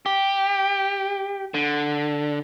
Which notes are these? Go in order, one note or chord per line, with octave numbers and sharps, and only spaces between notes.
G4
D3